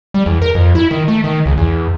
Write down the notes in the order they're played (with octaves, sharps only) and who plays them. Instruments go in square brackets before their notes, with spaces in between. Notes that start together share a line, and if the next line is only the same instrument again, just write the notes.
[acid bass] G3
E2
A#4
F2
E4
D#3
A3
D#3
C#2
E2